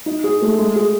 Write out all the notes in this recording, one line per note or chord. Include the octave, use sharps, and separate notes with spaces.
D#4
G#4
A3
G#3
G#4